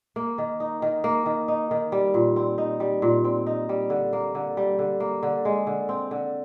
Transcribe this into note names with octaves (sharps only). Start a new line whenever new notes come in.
A#3
D#3
D#4
D#3
A#3
D#3
D#4
D#3
G3
A#2
C4
D#4
G3
A#2
C4
D#4
G3
D3
A#3
D3
G3
D3
A#3
D3
G#3
D3
C4
D3